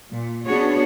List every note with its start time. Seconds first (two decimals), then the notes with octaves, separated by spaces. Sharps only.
0.12 A#2
0.46 B3 C#4 D4 F#4 G#4 C#5